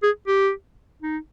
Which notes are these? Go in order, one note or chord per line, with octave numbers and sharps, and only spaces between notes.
G#4
G4
D#4